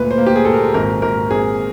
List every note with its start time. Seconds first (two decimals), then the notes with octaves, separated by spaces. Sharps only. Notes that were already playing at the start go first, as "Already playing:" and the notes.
Already playing: D2 A#2 B4
0.11 C5
0.18 A#3
0.27 G4
0.36 G#4
0.45 A#2 A4
0.53 A#4
0.74 G#1 A#4
1.02 G#1 A#4
1.31 G#1 G#4